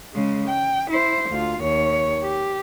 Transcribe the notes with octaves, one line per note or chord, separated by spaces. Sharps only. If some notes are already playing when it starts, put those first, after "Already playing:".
C#3 G#3
G5
E4 C5
D2 F4
D#2 C#5
G4